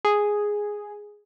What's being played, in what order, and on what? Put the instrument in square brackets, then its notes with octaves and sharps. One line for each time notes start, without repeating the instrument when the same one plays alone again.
[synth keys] G#4